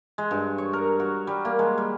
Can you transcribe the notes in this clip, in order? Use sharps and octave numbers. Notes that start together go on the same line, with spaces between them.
G#3
G2
C#5
A#4
F#4
G3
A#3
G#3
G3